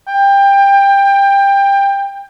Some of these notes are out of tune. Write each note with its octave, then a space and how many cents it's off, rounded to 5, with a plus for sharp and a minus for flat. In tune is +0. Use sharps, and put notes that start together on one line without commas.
G5 +20